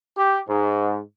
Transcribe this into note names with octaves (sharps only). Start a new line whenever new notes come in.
G4
G#2